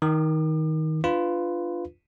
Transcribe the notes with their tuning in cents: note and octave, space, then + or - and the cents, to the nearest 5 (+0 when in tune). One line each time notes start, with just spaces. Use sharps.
D#3 +15 D6 +40
D4 +25 F4 +0 B4 +15